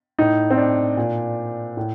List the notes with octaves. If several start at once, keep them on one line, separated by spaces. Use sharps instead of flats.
A2 D#4
C4
D4
A#2
A2